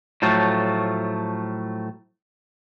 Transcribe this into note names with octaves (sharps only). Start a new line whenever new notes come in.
A2 F3 F#3 A3